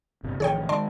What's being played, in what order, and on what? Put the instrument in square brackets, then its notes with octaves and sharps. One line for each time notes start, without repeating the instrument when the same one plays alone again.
[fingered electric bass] G1 C3
[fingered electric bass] A1 D#3 F3 [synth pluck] G#4 C#5 G5
[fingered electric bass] D#3 G#3 [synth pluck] D5 A5 C6